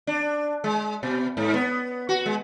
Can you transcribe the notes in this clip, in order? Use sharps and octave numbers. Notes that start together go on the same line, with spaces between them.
D4
G#3
B2
G#2
B3
F#4
G#3